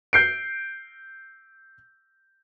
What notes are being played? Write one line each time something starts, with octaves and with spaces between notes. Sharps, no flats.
G6 C7 D7